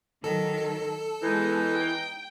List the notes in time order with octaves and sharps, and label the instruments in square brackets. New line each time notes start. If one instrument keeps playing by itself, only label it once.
[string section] D#3 F#3 [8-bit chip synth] A4
[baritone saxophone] E3 [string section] G#3 B3 [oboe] D#4
[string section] G5